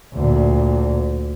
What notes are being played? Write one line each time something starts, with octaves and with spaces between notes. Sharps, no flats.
D2 A#2